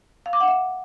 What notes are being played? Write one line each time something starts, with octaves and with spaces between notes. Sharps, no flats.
F5
D6
F#5
E5